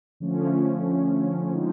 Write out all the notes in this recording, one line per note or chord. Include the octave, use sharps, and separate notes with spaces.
D3 F3 A3 C#4
D3 F3 G#3 C4 D#4